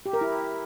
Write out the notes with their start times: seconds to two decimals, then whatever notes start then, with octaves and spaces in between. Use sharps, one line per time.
0.06 G4
0.13 A#4
0.21 E4